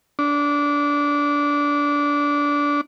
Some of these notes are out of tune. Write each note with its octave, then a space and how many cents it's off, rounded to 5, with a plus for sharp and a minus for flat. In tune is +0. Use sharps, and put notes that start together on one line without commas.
D4 -20